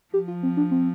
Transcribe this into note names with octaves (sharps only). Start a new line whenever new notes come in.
F3 G4
F4
C4
D4
C4